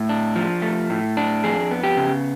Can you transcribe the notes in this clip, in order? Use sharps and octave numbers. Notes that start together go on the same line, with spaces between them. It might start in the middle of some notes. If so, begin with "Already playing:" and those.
Already playing: A2
D4
F3
A3
A2
D4
F2 G#4
B3
G4
C#3